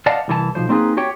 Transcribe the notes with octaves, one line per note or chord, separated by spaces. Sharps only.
C5 D5 D#5 F5 F#5 A5
C2 E3 F#4 A5
B1 F3 C5
A#3 C4 D#4 F4 G#4 B4
F#4 G4 C#5 G5